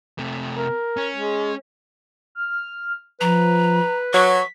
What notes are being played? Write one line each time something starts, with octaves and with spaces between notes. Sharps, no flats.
C3 A3
A#4
C#4
G#3
F6
F3 B4 A#5
F#3 C#6 B6